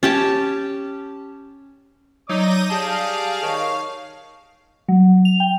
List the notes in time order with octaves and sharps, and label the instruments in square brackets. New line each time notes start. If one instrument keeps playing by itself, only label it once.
[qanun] C#4 G4 A5
[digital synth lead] F#3 [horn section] D#4 [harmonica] D5 D6 D#6 [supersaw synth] G6 A#6 D#7
[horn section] G3 G#4 [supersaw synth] F5 [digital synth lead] A5 [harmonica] D#6
[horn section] D#3 [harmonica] C#5
[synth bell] F#3
F7
G5